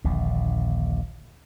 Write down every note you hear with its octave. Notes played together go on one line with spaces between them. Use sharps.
D#1 A#1 A#2 D3